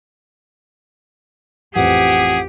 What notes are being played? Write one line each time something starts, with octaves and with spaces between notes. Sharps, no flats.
A1 F2 G4 G#4 F#5